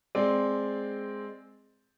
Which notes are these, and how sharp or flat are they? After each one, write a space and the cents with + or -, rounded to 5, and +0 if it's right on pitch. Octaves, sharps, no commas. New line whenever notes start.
G#3 +0 C4 +0 D5 +0